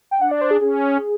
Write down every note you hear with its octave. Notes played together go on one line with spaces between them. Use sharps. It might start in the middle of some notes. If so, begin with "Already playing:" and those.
G5
D4 F#5
D5
C5
G#4
C#4 G#4